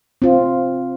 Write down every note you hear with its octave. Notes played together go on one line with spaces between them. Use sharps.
C4 F4